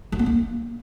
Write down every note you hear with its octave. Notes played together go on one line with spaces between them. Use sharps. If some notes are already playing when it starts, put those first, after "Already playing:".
F#3
B3
A#3